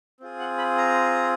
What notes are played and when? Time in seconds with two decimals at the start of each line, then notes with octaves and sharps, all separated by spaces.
0.20 C4 F4 G#4
0.40 F#5
0.58 B5
0.78 A#5